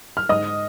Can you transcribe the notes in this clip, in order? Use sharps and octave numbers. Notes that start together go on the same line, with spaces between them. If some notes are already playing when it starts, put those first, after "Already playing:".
F6
G#2 D#5 D#6